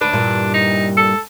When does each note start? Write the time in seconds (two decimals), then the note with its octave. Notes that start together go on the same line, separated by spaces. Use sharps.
0.01 D2 D4 B4
0.13 G2 A#2 E3
0.54 D#4
0.97 A4